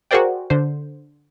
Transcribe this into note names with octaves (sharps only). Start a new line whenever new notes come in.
F#4 G#4 A#4 C5 D5 G5
D3 C5